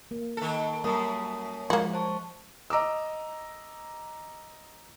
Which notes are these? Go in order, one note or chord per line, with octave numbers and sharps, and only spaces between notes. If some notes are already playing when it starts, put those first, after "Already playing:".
A#3
D#3 A4
F#2 G3 A#3 A#4 E5 A5 D#6
F3 G#3 A#3 F#4 F5
C5 A5 C#6
D#5 A#5 D6 E6